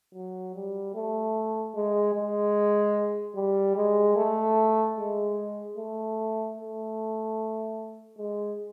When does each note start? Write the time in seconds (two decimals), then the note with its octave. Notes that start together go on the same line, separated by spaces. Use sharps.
0.14 F#3
0.55 G3
0.95 A3
1.75 G#3
2.15 G#3
3.36 G3
3.76 G#3
4.16 A3
4.97 G#3
5.78 A3
6.57 A3
8.18 G#3